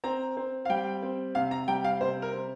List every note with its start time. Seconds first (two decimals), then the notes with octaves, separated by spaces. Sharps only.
0.04 C4 A#5
0.37 C4
0.65 F5
0.69 G3 G5
1.02 C4
1.35 C3 F5
1.51 A#5
1.68 G3 G5
1.84 F5
2.01 C3 C5
2.22 A#4
2.33 C4